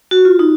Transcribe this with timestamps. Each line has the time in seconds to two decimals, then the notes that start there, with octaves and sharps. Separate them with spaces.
0.11 F#4
0.25 F4
0.39 D#4